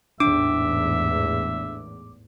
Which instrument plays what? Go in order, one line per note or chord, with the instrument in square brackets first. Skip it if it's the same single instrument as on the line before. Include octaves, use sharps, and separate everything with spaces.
[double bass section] A1 E2 G#2 [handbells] D4 [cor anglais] E5 [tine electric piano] D6